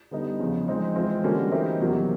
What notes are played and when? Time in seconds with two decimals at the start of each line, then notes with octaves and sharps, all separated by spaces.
0.11 D3 G3 B3 D#4
0.39 E2 C#3 F3
0.68 F3 G#3 C4 D#4
0.95 E3 G#3 C4 F4
1.24 D3 G3 A#3 C#4 F#4
1.51 E3 A3 C4 D#4 G4
1.80 E2 C3 D#3 F#3 A#3